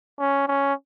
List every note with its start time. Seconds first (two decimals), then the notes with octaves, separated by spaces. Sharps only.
0.19 C#4
0.48 C#4